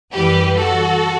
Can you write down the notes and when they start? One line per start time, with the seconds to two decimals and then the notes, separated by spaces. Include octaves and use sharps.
0.12 F#2 E3 G3 G4 B4
0.56 F#4 A4